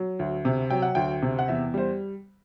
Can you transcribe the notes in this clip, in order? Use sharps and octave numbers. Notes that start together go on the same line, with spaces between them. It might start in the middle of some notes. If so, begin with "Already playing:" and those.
Already playing: F#3
D2
C3
F#3 G5
F#5
D2 G5
C3
F#5
E2 E5
G3 C5